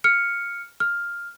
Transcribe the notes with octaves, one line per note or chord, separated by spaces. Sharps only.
F6 C#7
F6